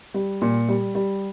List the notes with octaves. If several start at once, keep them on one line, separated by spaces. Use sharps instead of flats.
G3
A#2
G3
G3